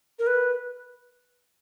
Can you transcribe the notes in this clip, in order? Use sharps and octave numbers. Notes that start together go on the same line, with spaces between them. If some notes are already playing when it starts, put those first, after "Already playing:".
A#4
B4